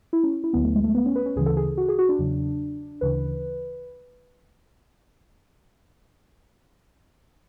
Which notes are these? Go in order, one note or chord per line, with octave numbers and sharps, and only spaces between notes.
E4
C#4
E4
D2 D3 F#3 B3
A3
G#3
A3
B3
C#4
B4
C#4
D2 C#3 E3 G#4
A4
G#4
F#4
G#4
F#4
D4
E2 C#3 F#3
D2 C#3 E3 B4